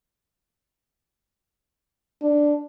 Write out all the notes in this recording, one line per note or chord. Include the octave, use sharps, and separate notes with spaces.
D4